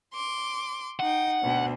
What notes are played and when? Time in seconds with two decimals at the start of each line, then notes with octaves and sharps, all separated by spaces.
0.13 C6 D6
1.00 D#4 F#5 G5
1.40 D2 B2